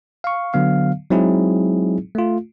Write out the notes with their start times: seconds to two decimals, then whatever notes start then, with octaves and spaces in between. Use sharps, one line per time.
0.24 F5 C#6
0.54 D3 F#3 B3 F5
1.10 F#3 G#3 C4 D#4 E4 G#4
2.15 A3 F4